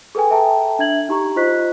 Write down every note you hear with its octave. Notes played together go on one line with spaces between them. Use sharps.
G#4 A4 B4 G5 G#5
A4 E5 G5 A5 A#5
D4 E5 G#6 F#7
D#4 G4 A#5 C#6
F4 C5 D#5 C#6 F#6 B6